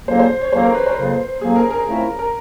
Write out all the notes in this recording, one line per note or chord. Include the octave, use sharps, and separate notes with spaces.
F2 C#3 F#3 A#3 C5
C5
C#5
F2 C#3 F#3 A#3 C5
A#4
B4
C5
F2 C#3 F#3 A#3
F2 C#3 F#3 A#3 G#4
A#4
A#4
C#3 F3 A3 C4 E4
A#4